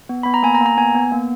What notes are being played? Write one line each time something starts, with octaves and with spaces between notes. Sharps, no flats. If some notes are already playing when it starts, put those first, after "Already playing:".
B3
B3 B5
A#5
A#3 G#5
A#5
A#3
A#5
B3 G#5
B3
A#3